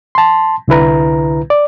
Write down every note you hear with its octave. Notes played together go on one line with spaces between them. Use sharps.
A5 C6
C2 D3 E4 B4 A#5
D5